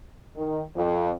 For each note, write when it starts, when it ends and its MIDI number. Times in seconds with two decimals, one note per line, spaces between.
0.36 0.61 51
0.76 1.12 41